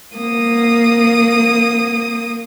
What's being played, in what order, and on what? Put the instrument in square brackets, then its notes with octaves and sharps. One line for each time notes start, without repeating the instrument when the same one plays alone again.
[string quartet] A#3 D#6